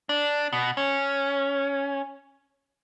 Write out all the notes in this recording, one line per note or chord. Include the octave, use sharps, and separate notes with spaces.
D4
B2
C#4